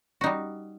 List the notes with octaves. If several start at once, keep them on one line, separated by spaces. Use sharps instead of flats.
G3 D#4 F#4